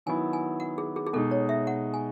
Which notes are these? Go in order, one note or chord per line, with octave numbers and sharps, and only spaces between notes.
D#3 F#3 B3 E4 G#5
G#5
F#5
G#4
G#4
G#4
B2 G#3 D#4 A4
C#5
E5
F#5
G#5